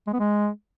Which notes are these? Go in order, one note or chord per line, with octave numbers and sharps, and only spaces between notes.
G#3
B3
G#3